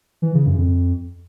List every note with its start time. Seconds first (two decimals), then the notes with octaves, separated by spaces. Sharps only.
0.22 E3
0.34 C#3
0.46 F#2
0.58 F2